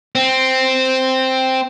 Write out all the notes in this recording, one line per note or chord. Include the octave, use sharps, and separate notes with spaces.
C4